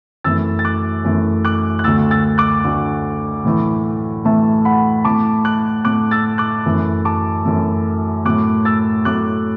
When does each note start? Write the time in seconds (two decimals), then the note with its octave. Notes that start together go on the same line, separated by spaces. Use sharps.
0.24 F#2 E3 A3 E6 A6
0.59 A6
0.65 D6 F#6
1.04 F#2 E3 A3
1.45 D6 F#6
1.79 F#6
1.84 D2 D3 A3 E6 A6
2.11 E6 A6
2.38 D6 F#6
2.64 D2 D3 A3
3.45 A2 E3 A3
4.25 A2 E3 A3 E5 A5
4.65 F#5 B5
5.05 A2 A3 A5 D6
5.45 D6 F#6
5.85 A2 A3 D6 F#6
6.11 E6 A6
6.38 D6 F#6
6.66 F#2 E3 A3
7.05 A5 D6
7.45 F#2 E3 A3
8.25 A2 F#3 A3 D6 F#6
8.65 E6 A6
9.05 A2 F#3 A3 D6 F#6